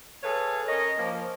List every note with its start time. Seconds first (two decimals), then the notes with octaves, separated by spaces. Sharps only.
0.23 G#4 A4 B4 C#5 F5
0.68 C#4 A#4 C#5 D#5
0.98 F3 A#3